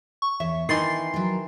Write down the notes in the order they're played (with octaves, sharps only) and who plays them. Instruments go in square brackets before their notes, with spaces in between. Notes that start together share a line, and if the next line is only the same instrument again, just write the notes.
[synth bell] C#6
[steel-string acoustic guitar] E2 C#5 [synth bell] E5
[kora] D#3 E3 [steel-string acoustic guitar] D#5 [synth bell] C6 A6 C7
[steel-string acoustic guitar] F#3 A#4